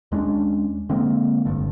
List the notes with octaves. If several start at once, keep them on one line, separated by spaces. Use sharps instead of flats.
D#2 G#3 C#4 D4
D3 G#3 A#3 C4
F1 A#1 G2 D3